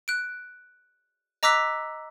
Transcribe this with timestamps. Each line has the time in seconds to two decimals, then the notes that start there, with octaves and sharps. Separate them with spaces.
0.08 F#6 D7
1.43 D#5 A#5 D6 E6 F#6 B6